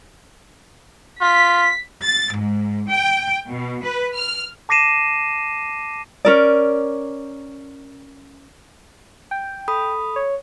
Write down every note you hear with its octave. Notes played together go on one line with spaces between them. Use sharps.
F4 B6
A6
G#2
G5
B2
B4
F6
A5 D6 A#6 C7 D#7 E7
C#4 A#4 D5
G5
A4 B5 D#6
C#5